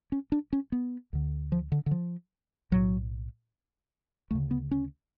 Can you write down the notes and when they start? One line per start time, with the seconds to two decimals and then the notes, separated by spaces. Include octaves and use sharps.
0.12 C#4
0.32 D4
0.53 C#4
0.72 B3
1.13 D2 D3
1.52 F3
1.72 D3
1.86 D3
1.91 F3
2.71 B1 A2 F#3
4.31 D2 C#3 A3
4.51 B3
4.71 C#4